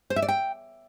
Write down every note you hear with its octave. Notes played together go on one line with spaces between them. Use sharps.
C5
E5
D5
G5